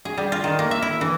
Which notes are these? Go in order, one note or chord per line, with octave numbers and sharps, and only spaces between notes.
G#4
G3
F4
D#3
A#3
E5
E4
E3